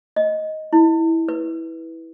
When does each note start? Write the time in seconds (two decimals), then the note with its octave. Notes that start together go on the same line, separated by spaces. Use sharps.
0.16 D#5
0.73 E4
1.28 B4